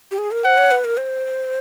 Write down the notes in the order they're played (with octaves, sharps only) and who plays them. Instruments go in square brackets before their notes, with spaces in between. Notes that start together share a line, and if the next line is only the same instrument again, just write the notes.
[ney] G4
G#4
A#4
[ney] C5 [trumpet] F#5
[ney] C#5
B4
A#4
C5